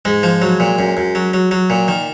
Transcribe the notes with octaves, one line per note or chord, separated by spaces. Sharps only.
G#2 G#3
F3
F#3
A#2
F#2
F#2
F#3
F#3
F#3
A#2
D#3